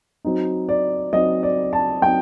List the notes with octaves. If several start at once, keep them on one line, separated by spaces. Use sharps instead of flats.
F#3 C4 D#4
D5
F#3 C4 D#4 D#5
D5
A5
F#3 C4 D#4 G5